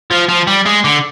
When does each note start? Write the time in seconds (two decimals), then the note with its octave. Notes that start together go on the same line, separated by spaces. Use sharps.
0.11 F3
0.29 F3
0.47 G3
0.66 G#3
0.84 D3